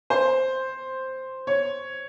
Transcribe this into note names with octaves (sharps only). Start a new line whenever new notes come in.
C5
C#5